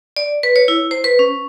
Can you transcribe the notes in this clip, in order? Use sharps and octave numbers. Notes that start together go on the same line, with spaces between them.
D5
B4
C#5
E4
C5
B4
C#4